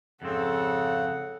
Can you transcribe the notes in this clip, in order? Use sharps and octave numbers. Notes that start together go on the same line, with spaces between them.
F2 G#2 C#3 C4 A4 F#5